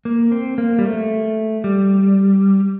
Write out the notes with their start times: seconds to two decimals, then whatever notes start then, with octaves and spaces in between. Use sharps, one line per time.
0.05 A#3
0.32 C4
0.58 A#3
0.79 G3
0.85 A3
1.64 G3